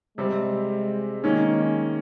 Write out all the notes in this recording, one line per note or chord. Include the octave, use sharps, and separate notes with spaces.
C3 G3 G#3 C4
D#3 G#3 A#3 C#4